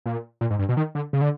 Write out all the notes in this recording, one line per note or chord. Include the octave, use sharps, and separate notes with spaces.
A#2
A#2
G#2
G2
B2
D#3
D3
C#3
D3